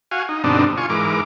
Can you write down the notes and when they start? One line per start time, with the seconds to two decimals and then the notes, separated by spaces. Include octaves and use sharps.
0.11 F#4 F5 G#5
0.29 D#4
0.44 G2 B2 D3 C4 D4 D#4
0.77 F4 G#5 C#6
0.90 G#2 E3 A#4 D6